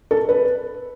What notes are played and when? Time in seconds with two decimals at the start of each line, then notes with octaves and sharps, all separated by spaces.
0.11 A4
0.29 B4